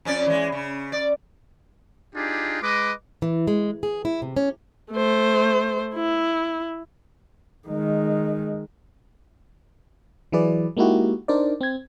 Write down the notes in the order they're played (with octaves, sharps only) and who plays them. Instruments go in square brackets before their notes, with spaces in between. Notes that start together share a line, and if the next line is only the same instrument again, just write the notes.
[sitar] F2 C#4 D5
E3 G#3
C#3
D5
[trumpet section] D4 D#4 F4 G4 G#4
G#3 B4 D#5 D6
[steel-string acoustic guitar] E3
G#3
G#4
E4
C3
C#4
[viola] A3 C5
E4
[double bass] D#3 G#3
[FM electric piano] E3 F#3 E4 G#4 B4 D5
G#3 A#3 D#4 E4 F#4 G4
D4 D#4 A#4 C5 D5
C4 G#6